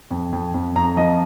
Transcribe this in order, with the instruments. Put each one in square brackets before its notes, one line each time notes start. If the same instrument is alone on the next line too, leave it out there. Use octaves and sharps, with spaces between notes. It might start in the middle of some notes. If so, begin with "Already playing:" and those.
[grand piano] F2
F2
F2
F2 A#5
F3 D#5